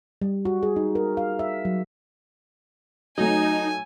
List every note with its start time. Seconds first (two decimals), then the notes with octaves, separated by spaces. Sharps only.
0.22 G3
0.45 F#4
0.63 G#4
0.76 D#4
0.95 A#4
1.17 F5
1.39 E5
1.65 F#3
3.18 F#3 A3 D#4 G#5